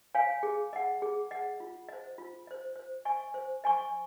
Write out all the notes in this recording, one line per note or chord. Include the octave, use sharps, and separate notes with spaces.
C#5 F5 G#5
G#4
D#5 F#5
G#4
D#5 F#5
F4
C5 D#5
F4
C5 D#5
C5
D#5 G#5 C#6
C5
D#5 G#5 C#6